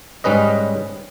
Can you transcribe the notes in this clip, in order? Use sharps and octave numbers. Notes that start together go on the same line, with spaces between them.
G#2 G3 C#4 B4 D#5